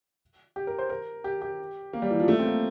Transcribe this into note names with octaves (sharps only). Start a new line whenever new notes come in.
G4
A#4
C5
A#4
G4
G4
A#3
G3
E3
F3
A3
C4
A#3